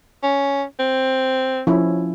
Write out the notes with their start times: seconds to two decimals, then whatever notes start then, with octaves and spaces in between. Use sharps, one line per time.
0.23 C#4
0.79 C4
1.67 F3 C#4 E4